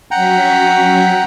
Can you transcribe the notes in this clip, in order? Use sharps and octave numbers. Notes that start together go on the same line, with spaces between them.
F#3 C#4 F#5 G5 A#5 B6